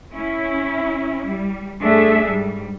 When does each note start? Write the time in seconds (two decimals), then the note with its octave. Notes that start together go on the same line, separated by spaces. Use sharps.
0.13 C#4 E4
1.28 G3
1.83 G2 A3 D4 G#4 A4 E5
2.27 G#2 G3